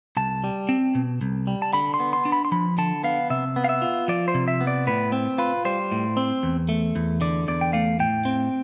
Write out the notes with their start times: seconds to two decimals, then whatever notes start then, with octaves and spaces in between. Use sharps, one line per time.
0.17 C2 A5
0.44 G3
0.69 C4
0.95 B2
1.21 C2
1.47 G3
1.62 A5
1.73 D3 B5
1.94 C6
2.00 B3
2.13 C6
2.25 D4
2.32 B5
2.45 C6
2.52 F3 B5
2.78 D3 A5
3.04 B3 F5
3.30 C3 E5
3.56 B3
3.64 F5
3.69 E5
3.82 F4
4.08 F3 D5
4.28 C5
4.34 C3
4.48 E5
4.61 B3
4.67 D5
4.87 A2 B4
5.12 C4
5.38 F4 B4
5.65 G3 C5
5.91 A2
6.17 C4
6.43 E2
6.69 A3
6.96 E2
7.21 D3 D5
7.48 E2 D5
7.61 G5
7.73 A3 F5
8.00 A2 G5
8.25 C4